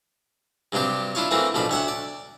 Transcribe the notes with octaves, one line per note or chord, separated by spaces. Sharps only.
G2 C3 F#3 D4 G4
D4 E4 F4 C#5
E3 A3 A#3 C4 F#4
A1 B2 F3 D4 B5
D2 C#5 E5 F#5
D5